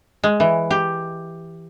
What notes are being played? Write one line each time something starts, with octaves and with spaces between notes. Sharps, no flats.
G#3
E3
G4